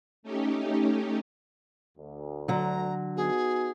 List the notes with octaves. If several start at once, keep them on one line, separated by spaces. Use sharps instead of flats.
A3 C#4 D#4 G4
D2
D3 F#3 A#5
B3 D#4 F#4 G#4